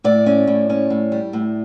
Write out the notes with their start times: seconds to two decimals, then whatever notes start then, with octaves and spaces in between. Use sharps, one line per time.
0.04 A2 D5
0.26 C#4
0.47 A2
0.70 C#4
0.90 A2
1.12 G3
1.33 A2